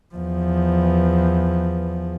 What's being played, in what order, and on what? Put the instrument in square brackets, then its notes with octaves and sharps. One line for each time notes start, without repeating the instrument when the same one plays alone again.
[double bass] E2 F3